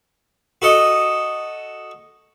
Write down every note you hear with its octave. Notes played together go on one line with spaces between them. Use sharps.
F#4 A4 D#5